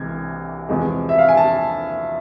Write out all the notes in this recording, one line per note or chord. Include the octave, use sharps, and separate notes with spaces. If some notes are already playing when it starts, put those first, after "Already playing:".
Already playing: C2 C3 E3 G#3 G#6
E2 C3 F3 G#3
E5
F5
G#5
A5